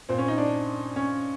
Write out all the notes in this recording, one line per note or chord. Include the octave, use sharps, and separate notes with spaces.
A#2 C4
C#4
D#4
D4
C#4